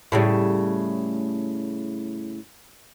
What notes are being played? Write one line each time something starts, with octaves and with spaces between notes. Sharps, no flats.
A2 C#3 G3